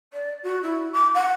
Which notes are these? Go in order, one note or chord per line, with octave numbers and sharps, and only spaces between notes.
D5
F#4
E4
D6
F#5